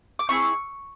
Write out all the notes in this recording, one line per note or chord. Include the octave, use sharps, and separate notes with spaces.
D6
C4 E4 G#4 C#6